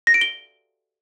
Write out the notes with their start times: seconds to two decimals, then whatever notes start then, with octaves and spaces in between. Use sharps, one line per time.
0.07 A#6
0.14 D7
0.21 G7